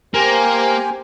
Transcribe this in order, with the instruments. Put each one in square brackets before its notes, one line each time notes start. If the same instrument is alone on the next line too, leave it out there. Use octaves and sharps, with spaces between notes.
[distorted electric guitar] A#3 [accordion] G4 C5 G#5